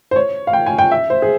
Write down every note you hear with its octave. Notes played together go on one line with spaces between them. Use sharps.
C5
C#5
F5
G5
G#5
G5
E5
C5
G#4